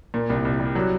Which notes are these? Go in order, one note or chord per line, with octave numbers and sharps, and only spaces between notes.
A#2
C2
C2
G3
F#3